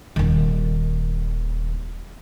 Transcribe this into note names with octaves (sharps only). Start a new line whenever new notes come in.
D#1 D#3